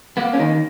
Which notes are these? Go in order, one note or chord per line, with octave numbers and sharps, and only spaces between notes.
A#3 B3
C#4
D#3 D#4